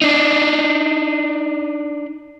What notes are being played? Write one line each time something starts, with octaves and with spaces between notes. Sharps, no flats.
D4 D#4